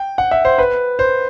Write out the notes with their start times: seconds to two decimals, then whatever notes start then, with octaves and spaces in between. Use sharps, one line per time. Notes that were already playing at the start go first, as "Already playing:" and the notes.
Already playing: G5
0.18 F#5
0.31 E5
0.45 C5
0.58 B4
0.99 C5